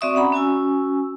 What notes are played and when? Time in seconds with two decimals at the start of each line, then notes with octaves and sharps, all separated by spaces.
0.01 C4 F#4 D5 E5 C#6 D#6
0.15 C#4 F#5 A#5 B5
0.33 C#4 F#4 G#5 E6